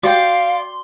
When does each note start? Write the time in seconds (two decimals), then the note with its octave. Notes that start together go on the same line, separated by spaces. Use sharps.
0.03 F#4 D5 F5 G5 C6